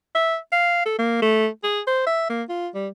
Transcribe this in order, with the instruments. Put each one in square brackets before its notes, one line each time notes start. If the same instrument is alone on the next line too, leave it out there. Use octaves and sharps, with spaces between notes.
[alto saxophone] E5
F5
A4
A#3
A3
G#4
C5
E5
A#3
F4
G3